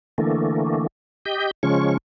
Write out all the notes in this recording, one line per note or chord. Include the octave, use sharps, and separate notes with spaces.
D3 E3 A3 A#3
G4 D#5 G6
C#3 F3 G#3 C#4 C#6